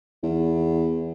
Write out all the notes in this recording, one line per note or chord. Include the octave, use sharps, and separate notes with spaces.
E2